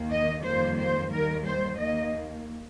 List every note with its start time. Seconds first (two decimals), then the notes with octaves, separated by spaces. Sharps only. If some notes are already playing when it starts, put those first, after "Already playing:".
Already playing: D#2 D#3 A#3
0.10 D#5
0.44 F2 D#3 G3 A#3 C5
0.78 C5
1.11 D#2 D#3 G3 A#4
1.45 C5
1.79 D#2 D#3 A#3 D#5